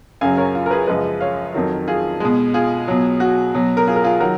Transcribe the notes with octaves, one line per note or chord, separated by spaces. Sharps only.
F#2 C#3 F#3 F5 G#5
A#4 C#5
F4
A#4
G#4 B4
F#2 C#3 F3 G#3 B4 D#5
C#5 F5
F2 D#3 F#3
F4 G#4
B2 G#3
F4 G#4
B2 F#3
F#4
B2 F#3
A#4
F4 G#4
A#4
F4 G#4
D#3 F#3 F#4 A#4